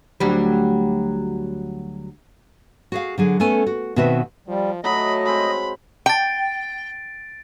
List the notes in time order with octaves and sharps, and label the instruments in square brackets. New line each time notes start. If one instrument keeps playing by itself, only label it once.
[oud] D2 F#3 G3
[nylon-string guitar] F#4 G#4 F5
D3 F#3 G#4
A3 B3 C#4 A4 G#5
F#4
B2 D#3 C4 F#4 B4 E5
[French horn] F3 [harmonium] G3
[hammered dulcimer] F#3 [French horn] A3 [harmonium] D#5 [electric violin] B5
[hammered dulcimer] G#3 C4 [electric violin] B5
[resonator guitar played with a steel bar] G5 [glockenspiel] A6 D7